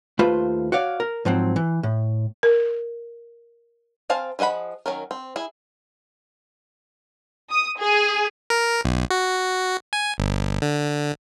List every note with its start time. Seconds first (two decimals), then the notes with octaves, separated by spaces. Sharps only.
0.19 D#2 A3 F4 B4 C5
0.72 F#4 C#5 D5 F5
1.00 A#4
1.25 G#2 F3 F#3 C4
1.56 E3
1.83 A2
2.43 A#4
4.10 C4 C5 F5 G#5 A5
4.39 F3 G#4 D#5 F#5 B5
4.86 D#3 F#3 C#4 A#4
5.11 C4
5.36 E4 G#4
7.50 D#6
7.79 G#4
8.50 A#4
8.85 B1
9.10 F#4
9.93 G#5
10.18 G1
10.62 D3